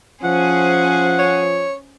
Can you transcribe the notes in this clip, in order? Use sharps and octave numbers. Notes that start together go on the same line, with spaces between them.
F3 C#4 G#4 C5 F#5
C#5